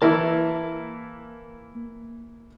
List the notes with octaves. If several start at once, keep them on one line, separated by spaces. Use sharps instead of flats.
E3 A#3 E4 A#4 A5